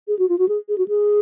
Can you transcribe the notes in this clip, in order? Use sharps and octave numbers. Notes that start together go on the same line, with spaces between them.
G#4
F#4
F4
F#4
G#4
G#4
F#4
G#4